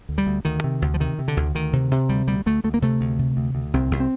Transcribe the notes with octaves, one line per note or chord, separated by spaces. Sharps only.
D2
G3
D2
D2 D#3
C3
D2
F3
C3 D#3
C3
D3
D2
D2 D#3
C3
C3
D2 G3
D2 G3
D2 A3
D2 A3
A#3
C3 A3
D2
C3
D2
D2
C2 C4
C2
C4